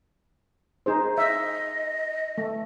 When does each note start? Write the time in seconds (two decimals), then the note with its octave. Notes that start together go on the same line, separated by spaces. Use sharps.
0.86 D#4 G#4 C5
1.18 D#5 E5
2.38 A3